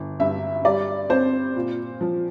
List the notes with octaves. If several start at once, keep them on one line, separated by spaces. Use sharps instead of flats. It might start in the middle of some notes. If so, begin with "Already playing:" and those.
Already playing: G1
G2 E5
G3 D5
C4 C5
A#2
F3